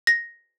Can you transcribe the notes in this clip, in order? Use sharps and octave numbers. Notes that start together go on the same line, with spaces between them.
A#6